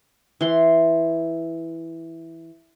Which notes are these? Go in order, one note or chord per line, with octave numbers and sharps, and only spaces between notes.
E3 C6